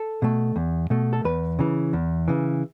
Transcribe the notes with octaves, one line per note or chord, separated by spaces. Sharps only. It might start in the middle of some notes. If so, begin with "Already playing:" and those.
Already playing: A4
B2 A3
E2
B2 A3
A4
E2 B4
C#3 E3
E2
C#3 E3